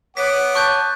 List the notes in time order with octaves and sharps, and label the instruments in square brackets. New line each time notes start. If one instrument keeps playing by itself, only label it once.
[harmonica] B3 D6 [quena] C#5 [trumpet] F#5 [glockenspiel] B6
[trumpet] A5 [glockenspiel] C#6 F#6 G6